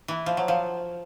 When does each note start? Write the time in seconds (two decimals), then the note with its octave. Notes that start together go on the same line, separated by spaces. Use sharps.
0.08 E3
0.26 F3
0.37 F#3
0.48 F3